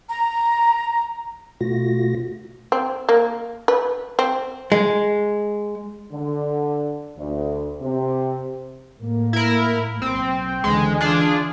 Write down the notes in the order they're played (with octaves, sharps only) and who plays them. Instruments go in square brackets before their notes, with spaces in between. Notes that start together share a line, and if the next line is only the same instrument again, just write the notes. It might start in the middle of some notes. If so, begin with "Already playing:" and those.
[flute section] A#5
[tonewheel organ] B2 A3 F4 F#4 A#6
[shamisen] C4
A#3
B4
C4
[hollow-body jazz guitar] G#3
[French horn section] D3
D2
C3
[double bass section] A2 A#3
[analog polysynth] E4 A#4
[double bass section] B1 [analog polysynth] C4
[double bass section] C#2 D3 E3 [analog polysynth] G#3
[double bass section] E3 [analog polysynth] D4 F4 G#4